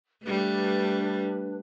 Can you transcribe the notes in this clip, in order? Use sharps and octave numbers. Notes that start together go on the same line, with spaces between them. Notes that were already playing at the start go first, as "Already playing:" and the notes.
G3 A3 D4 B4